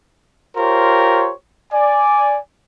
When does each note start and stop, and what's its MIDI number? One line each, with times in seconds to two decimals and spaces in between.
0.57 1.32 65
0.57 1.32 67
0.57 1.32 70
0.57 1.32 72
0.57 1.32 73
1.72 2.38 74
1.72 2.38 80